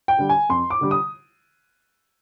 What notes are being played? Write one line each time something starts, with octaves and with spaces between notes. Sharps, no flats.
G5
D3 G3
G#5
F2 C6
D6
D3 G3
D#6